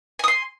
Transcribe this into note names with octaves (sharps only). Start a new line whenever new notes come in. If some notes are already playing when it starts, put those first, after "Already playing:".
G#5 C6 D#6